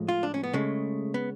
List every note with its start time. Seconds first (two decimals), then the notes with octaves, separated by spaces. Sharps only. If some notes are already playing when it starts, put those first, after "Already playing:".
Already playing: A2 F3 G#3
0.08 F4
0.23 D4
0.34 C#4
0.43 B3
0.53 C#3 G#3 A3
1.14 B3